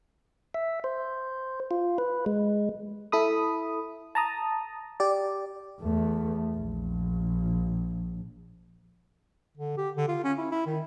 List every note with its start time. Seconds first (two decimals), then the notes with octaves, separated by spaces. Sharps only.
0.54 E5
0.84 C5
1.71 F4
1.98 B4
2.26 G#3
3.12 E4 A4 B5 D#6
4.15 A5 A#5 D#6
5.00 G4 D5
5.81 E2 A3
6.56 A#1
9.58 D3
9.78 G4
9.97 D3
10.08 F4
10.24 C#4
10.38 E4
10.51 E4
10.66 D#3